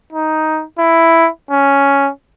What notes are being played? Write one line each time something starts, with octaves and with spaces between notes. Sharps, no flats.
D#4
E4
C#4